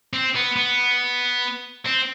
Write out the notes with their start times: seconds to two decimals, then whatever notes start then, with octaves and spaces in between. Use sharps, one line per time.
0.13 C4
0.35 B3
0.56 B3
1.85 C4